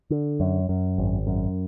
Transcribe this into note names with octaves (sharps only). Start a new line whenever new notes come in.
D3
F#2
F#2
G#1
F#2